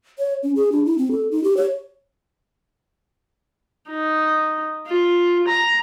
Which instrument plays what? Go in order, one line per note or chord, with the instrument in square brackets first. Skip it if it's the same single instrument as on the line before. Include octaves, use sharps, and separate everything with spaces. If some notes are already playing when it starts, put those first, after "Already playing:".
[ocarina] C#5
C#4
G#4
D4
E4
C4
A4
D#4
G4
C#5
[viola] D#4
F4
A#5